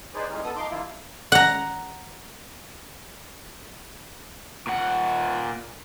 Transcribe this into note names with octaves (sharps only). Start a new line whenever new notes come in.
D#4 G#4 B4 C5 D5
F2 E3 G3 G#3 C#4 D#4
B3 A4 D#6
F3 D#4 C6 D6
G2 D#3 A#3 E4 F4
F#5 A#5
A#2 F#5